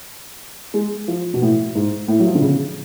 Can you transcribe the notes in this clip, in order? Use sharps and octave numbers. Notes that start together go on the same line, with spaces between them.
G#3
F3
B2
A2
G#2
A2
F#3
F3
D3
C#3